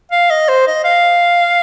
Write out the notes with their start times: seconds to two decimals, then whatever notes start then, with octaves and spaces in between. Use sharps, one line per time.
0.12 F5
0.30 D#5
0.49 C5
0.67 D#5
0.84 F5